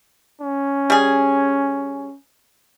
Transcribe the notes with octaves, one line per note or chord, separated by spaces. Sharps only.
C#4
G3 G#4